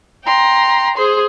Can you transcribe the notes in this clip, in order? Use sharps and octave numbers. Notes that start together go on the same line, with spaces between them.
G5 A#5 C6
G#4 C5 C6